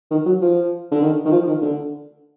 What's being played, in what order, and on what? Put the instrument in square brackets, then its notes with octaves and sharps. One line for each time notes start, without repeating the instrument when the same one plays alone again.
[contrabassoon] D#3
F#3
F3
D3
D#3
D#3
F3
D#3
D3